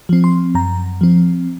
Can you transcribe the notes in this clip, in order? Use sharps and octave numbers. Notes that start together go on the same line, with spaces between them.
F3 C4
C6
F#2 A#5
F3 C4